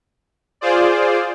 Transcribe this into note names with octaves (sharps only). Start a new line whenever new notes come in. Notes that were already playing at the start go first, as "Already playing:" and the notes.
F4 G#4 C5 D5